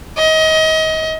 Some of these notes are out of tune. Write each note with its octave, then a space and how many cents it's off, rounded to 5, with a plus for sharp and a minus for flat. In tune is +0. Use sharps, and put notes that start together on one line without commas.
D#5 +30